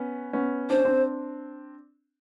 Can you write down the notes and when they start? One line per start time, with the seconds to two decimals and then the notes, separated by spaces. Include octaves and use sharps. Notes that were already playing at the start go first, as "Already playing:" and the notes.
Already playing: B3 C#4
0.33 B3 C#4
0.70 D4 C5
0.77 C#4
0.85 C4 D4